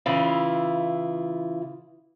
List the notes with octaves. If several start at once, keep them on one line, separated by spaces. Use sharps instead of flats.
C#3 E3 E4 F4